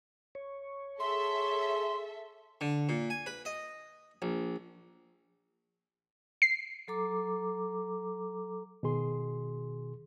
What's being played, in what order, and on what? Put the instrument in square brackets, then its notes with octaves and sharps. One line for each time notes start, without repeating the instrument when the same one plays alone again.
[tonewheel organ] C#5
[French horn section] G#4 [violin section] A4 E5 [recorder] C6
[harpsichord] D3
A#2
G#5
B4
D#5
A#1
[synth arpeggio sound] C7
[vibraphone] F#3 A4 A#5 D6
[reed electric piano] B2 D#3 G#4 C6